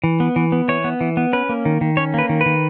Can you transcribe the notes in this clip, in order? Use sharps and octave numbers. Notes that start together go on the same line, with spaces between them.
E3
B3
E3
B3
E3 C#5
B3
E3
B3
C#4 B4
A#3
D#3
D#3
C#4 C#5
A#3 B4
D#3
B4
D#3